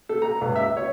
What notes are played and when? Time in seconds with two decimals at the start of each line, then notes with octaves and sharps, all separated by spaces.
0.09 A4
0.22 A#5
0.41 C#2
0.56 E5
0.77 C#5